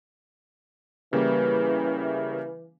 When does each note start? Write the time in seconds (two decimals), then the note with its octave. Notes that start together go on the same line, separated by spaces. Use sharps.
1.13 C#3 E3 G3 A#3